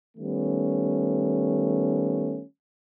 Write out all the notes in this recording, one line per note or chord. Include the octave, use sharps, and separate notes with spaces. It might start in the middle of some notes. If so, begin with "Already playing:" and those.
D#3 G3 A3 B3 C#4